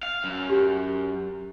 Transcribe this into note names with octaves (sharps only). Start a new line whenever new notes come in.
F5
F#2
G4